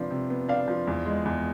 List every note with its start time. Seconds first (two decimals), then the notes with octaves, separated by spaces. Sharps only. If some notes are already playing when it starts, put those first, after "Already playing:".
Already playing: C3 F3 B3 D4
0.11 C3
0.30 B3
0.49 D4 F5
0.68 F3
0.87 E2
1.06 G#3
1.25 E2